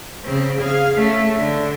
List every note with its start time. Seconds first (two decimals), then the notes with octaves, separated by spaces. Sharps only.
0.25 C#3 C4
0.60 G#4 F5
0.96 A3 C#4
1.35 D3